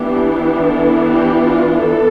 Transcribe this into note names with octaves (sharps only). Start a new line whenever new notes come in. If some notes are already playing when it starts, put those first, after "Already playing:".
Already playing: E3 B3 D4 G4
G4
A4
G4
F4
A4